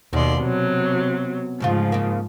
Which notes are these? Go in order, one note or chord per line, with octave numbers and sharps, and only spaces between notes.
D#2 B2 D5 C6
C3 F#3
D2 G#2 C#3 F3 F4
C#3 A#3